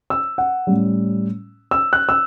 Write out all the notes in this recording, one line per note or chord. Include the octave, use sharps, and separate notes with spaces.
E6
F#5
A2 G3 C#4
E6
F#6
E6